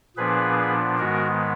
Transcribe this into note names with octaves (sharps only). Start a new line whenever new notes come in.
A#2 F3 B3 D4 G#4 B4
G#2 D#3 G#3 B3 F#4 A#4